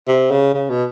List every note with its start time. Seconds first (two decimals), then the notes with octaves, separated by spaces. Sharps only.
0.08 C3
0.31 C#3
0.54 C#3
0.70 B2